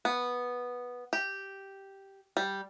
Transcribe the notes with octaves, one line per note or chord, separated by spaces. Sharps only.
B3
G4
G3